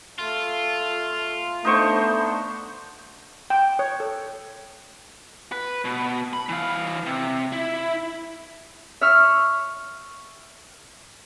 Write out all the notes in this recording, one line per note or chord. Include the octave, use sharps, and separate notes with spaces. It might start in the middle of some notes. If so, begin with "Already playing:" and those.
A3 F4
A3 B3 D4 D#4 C5 C#6
G5
C#5
A4
B4
B2
B5
E3 F5
C3
E4
E5 C#6 E6 F6